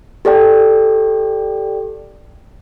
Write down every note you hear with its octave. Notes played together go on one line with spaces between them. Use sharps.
G4 A4 D5 G5